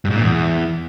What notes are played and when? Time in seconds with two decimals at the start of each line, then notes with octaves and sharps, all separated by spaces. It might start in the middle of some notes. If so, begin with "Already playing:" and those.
0.05 G2
0.10 G#2
0.16 A#2
0.22 E2